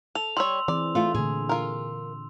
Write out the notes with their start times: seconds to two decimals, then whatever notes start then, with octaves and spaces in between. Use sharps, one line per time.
0.15 A4 F7
0.37 G3 C#5 C6 E6
0.68 E3 C4 G#4 D5
0.95 A3 F4 C6
1.15 A#2 D3 G#4
1.49 F4 A#4